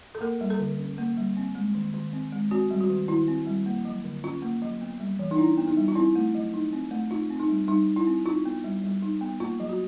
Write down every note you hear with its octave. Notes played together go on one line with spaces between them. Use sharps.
A4
A#3 A#4
G3
A4
D3
C#4
A#3
G3
C4
G#3
D#3
D#3
C4
G#3
C4 F#4
G3
F#4
D#3
D#3 E4
C4
G3
A#3
F#3
D3
C#4 F4
A#3
F#3
B3
G3
E3
D#4
D4 E4
B3
D#4
G3
F4
C4 E4
A3
F#3
D#4
C4
A3
D#4 F4
C4
D#4
G3
G3 D#4
D#4
E4
C4
D#4 F4
B3
G3
G3
D#4
B3
A#3 F4
F#3
F#4